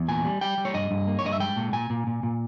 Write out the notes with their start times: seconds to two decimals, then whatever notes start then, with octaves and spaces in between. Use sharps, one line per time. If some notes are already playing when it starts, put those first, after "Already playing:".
Already playing: E2
0.08 A#2 G#5
0.25 G3
0.41 G3 G5
0.58 G3
0.65 C#5
0.74 G2 D#5
0.91 G2
1.07 A#3
1.19 C#5
1.24 G2 D#5
1.32 E5
1.40 G#3 G5
1.56 A#2
1.73 A#2 G#5
1.90 A#2
2.07 A#2
2.23 A#2